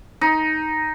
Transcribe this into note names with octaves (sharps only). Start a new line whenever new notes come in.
D#4